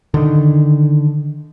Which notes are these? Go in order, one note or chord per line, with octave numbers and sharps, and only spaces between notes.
D3 D#3